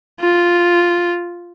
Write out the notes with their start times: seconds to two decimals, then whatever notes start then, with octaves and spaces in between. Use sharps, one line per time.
0.20 F4